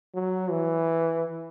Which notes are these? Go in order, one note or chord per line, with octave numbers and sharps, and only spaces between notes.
F#3
E3